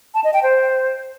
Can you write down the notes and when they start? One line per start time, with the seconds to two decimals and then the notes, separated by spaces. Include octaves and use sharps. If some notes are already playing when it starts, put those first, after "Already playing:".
0.14 A5
0.24 D#5
0.34 G5
0.43 C5